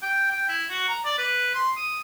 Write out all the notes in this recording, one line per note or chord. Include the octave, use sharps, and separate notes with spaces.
G5
G5
E4
F#4
A#5
D5
B4
C6
D#6